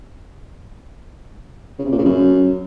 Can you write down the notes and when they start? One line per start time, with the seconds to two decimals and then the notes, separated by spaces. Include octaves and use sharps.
1.79 C#3
1.85 C3
1.92 A#2
1.98 C#3
2.05 F#2